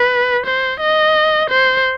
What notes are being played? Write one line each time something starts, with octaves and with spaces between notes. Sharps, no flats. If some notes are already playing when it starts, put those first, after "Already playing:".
Already playing: B4
C5
D#5
C5